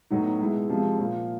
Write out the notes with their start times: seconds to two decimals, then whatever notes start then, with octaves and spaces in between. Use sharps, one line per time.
0.11 A2 F#3 B3 D#4
0.40 B2 G#3 B3 E4
0.69 C3 F3 G#3
0.99 A#2 F3 A#3